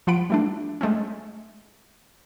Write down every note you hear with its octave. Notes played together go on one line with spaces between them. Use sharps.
F3 F4 F#5 B5 D7
G3 A3 D4
G#3 A3 C4 C#4